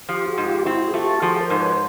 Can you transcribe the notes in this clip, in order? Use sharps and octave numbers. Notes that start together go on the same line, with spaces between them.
F3 F4 G4
F#4 G#4
G#2
F4 G4
C4 E4 F#4
G#4
A3 F4 G4
A4
F3 F#4 G#4
A#4 C5
G#2
B4 C#5
C5